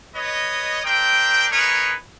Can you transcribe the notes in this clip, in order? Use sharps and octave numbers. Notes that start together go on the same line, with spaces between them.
B4 C#5 D#5
C4 D4 A#4 G5
D#4 G#4 A#4 B4 C#5